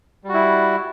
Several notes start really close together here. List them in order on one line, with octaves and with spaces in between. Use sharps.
G3 F#4 E4